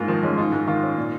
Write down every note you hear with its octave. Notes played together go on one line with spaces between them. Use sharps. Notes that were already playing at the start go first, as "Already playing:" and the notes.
Already playing: G#2 A#3 F4
D#3 F3
G#3 C#4
D#4 F4
G#2
D#3 F4
C#4
A#2